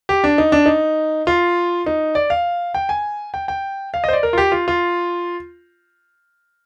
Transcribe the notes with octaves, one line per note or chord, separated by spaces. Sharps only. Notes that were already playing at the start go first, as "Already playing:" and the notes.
G4
D4
D#4
D4
D#4
F4
D#4
D5
F5
G5
G#5
G5
G5
F5
D#5
C5
D5
A#4
F4
G4
F4
F4